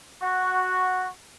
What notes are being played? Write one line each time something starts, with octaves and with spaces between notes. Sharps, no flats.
F#4